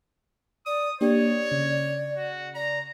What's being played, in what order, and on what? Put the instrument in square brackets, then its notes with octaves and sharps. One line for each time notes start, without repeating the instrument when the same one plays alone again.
[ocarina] D5 [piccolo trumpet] D#6
[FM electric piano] A#3 D4 G4 [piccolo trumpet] C#5 [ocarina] D5
[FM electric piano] C#3
[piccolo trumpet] F#4
[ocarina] D5 [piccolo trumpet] A#5